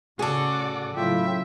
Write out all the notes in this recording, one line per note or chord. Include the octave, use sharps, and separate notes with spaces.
A2 C#3 F#4 G#4 A4 D5
A2 C#3 F#3 A#3 F4 E5 G5